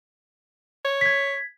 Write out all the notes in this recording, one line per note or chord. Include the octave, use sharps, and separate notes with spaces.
C#5
G#6 B6